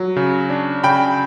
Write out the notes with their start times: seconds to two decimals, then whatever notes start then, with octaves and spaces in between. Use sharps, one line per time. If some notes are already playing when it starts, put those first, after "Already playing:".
Already playing: F#3
0.16 C#3
0.50 D4
0.84 C#3 G5 B5